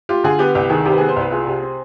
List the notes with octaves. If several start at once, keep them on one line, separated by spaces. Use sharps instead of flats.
F4 G4
D3 G#4
B3 G4
C2 G4
D#3 G#4
C3 G4
B4
B3 G#4
C5
C2 B4
F4 G#4
C3
C4